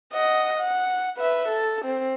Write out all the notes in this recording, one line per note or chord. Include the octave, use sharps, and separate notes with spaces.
D#5 F#5
F#5
B4 E5
A4
C4